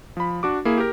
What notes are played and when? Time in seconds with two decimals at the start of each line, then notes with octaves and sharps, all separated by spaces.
0.17 F3 B5
0.43 D4 F#4 D6
0.65 A#3 E4 G#4
0.78 G4 A#4